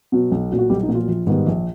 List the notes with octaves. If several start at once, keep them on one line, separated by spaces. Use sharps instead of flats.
B2 F#3
B1
A#2 F#3
F#4
B1 G3 G4
D#4
A#2 F#3 F#4
F3 F4
A#1
G#2 D#3 G3 B3
A#1